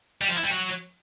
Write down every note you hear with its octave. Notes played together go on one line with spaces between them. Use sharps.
G3
F3
E4
G3
F#3